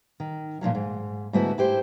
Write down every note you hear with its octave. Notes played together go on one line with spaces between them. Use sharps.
D#3
A#2 C#3 F3 F#3
G#2
G#2 D3 A3 B3 E4 F#4
E4 G4 C5